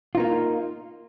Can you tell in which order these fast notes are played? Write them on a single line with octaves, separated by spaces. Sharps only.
F4 D#4 A#3